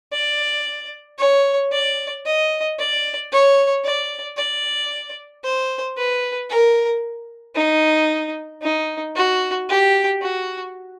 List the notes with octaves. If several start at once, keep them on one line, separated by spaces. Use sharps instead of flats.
D5
C#5
D5
D#5
D5
C#5
D5
D5
C5
B4
A#4
D#4
D#4
F#4
G4
F#4